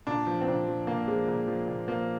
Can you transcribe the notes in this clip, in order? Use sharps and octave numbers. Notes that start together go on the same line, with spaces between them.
A#2 D4
F3
C4
A#2 D4
F3
A#2 A#3
F3 G#3
A#2
F3
A#2
F3 A#3